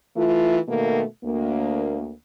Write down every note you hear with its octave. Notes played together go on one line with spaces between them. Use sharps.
E3 A3 F4
B2 D#3 A3 A#3
D2 A#3